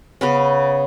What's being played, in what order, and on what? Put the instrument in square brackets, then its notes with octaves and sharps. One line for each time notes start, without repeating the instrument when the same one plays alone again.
[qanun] C#3 B3 C#4